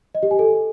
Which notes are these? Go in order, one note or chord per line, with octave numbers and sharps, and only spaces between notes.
D#5
G4
G#5
A4